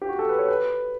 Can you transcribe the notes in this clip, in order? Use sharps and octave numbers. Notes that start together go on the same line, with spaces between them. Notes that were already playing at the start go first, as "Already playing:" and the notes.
G4
F#4
A4
B4
C#5
B4